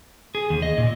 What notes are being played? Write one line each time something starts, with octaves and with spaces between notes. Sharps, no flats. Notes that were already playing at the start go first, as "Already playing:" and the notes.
G#4
D#2
D#5
A#2